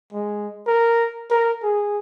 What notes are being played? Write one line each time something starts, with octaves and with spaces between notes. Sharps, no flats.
G#3
A#4
A#4
G#4